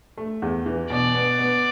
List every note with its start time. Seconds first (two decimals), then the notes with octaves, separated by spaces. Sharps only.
0.18 A3
0.42 E2
0.66 E3
0.90 B2 D5
1.14 B3
1.39 B3